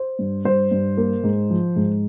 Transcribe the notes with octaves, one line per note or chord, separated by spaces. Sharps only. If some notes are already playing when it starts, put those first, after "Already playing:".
Already playing: C5
G2
G2 C5
G2
A#3
G#2
F3
G#2